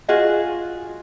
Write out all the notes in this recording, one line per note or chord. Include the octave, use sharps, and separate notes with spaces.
F4 F#4 G#4 D#5